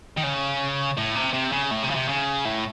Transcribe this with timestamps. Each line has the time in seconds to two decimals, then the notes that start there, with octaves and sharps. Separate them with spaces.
0.17 D#3
0.23 C#3
0.97 A2
1.15 C3
1.33 C3
1.52 C#3
1.71 A2
1.83 C3
1.90 C#3
1.95 C3
2.08 C#3
2.45 A2